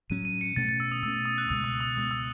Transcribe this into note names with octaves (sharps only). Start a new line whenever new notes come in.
A2 F#3 C#4 D#7
D#7
C#7
B2 A3 C#4 A6
A6
E6
D#6
B2 A3 C#4 E6
D#6
F#6
C#2 B2 G#3 D#6
E6
D#6
C#2 B2 G#3 D#6
E6